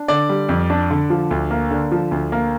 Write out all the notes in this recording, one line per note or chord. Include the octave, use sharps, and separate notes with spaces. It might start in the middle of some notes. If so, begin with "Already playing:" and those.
Already playing: D4
D3 D5
G3
F2
D4
D3
F3
D2
A#3
D3
F3
D2
A#3